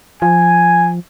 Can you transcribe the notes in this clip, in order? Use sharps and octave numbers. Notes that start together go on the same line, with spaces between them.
F3 G#5